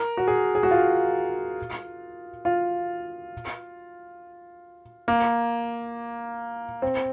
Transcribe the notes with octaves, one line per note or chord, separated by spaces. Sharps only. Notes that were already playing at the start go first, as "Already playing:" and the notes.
Already playing: A#4
F#4
G#4
G#4
F#4
F4
F4
A#3
C4